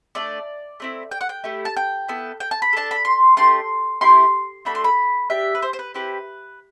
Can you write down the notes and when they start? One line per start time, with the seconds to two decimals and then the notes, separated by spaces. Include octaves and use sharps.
0.15 A3 D4 A4 D5
0.80 A3 C4 E4
1.12 G5
1.21 F#5
1.29 G5
1.44 A3 E4 G4
1.65 A5
1.77 G5
2.08 B3 E4 A4
2.40 G5
2.51 A5
2.62 B5
2.73 D4 A4 A5
2.91 B5
3.05 C6
3.37 A3 D4 G4 C6
4.01 A3 E4 G4 C6
4.65 A3 D4 F#4 A4 B5
4.75 C6
4.84 B5
5.30 D4 G4 E5
5.55 B4
5.62 C5
5.73 C5
5.79 B4
5.94 C4 E4 G4 B4